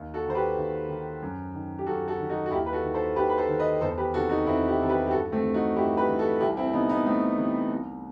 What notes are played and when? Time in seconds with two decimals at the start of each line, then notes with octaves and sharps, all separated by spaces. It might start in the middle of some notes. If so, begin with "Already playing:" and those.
Already playing: D#2
0.14 F#4 A4
0.25 D#3 C5
0.35 G4 B4
0.57 D#2
0.89 D#3
1.22 F#2
1.54 D#3
1.79 G4
1.87 F#2 F#4 A4
2.08 F#4 A4
2.19 D#3
2.30 D#4 F#4
2.46 F#4
2.51 D#2 E4 G4
2.66 B4
2.73 F#4 A4
2.84 D#3
2.94 A4 C5
3.16 D#2 G4 B4
3.29 B4
3.38 A4 C5
3.49 D#3
3.59 B4 D#5
3.81 E2 A4 C5
3.98 G4 B4
4.14 C3 D#3 F#4 A4
4.30 D#4 F#4
4.46 E2 C4 E4
4.68 E4 G4
4.78 C3 D#3 A4
4.89 G4 B4
5.07 G4
5.11 G2 F#4 A4
5.32 A3 C4
5.44 E3
5.54 D#4 F#4
5.76 G2 E4 G4
5.97 G4 B4
6.09 E3
6.19 F#4 A4
6.40 C2 E4 G4
6.57 C4 E4
6.67 C4
6.73 C3 E3 B3 D#4
6.89 B3 D#4
7.05 C2 A3 C4
7.38 C3 E3
7.70 C2